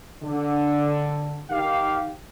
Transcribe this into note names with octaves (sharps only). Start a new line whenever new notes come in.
D3
D#3 G4 F5